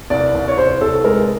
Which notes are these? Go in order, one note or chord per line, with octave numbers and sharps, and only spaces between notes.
C2 D5
C2
C#5
C2 C5
C2 A4
G#3 A#4